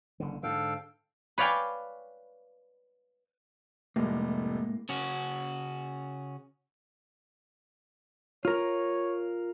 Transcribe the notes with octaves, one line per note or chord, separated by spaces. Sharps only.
F#1 D3
G#2 D3 A4 F5 G5
B4 C#5 D5 F5 G5 G#5
F1 C2 A2 G#3 A#3
C#3 C#4 F#4
F4 A#4 C#5